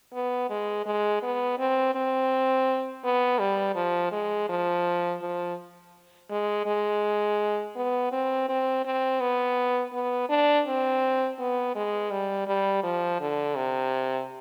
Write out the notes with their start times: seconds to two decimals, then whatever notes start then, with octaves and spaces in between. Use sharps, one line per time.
0.14 B3
0.50 G#3
0.86 G#3
1.23 B3
1.59 C4
1.95 C4
3.04 B3
3.39 G3
3.76 F3
4.12 G#3
4.49 F3
5.22 F3
6.30 G#3
6.66 G#3
7.76 B3
8.12 C4
8.49 C4
8.85 C4
9.21 B3
9.93 B3
10.29 D4
10.67 C4
11.39 B3
11.75 G#3
12.11 G3
12.47 G3
12.84 F3
13.21 D3
13.57 C3